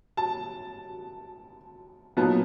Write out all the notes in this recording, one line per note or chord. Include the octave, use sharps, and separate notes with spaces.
A5
A#2 F#3 B3 D#4 A5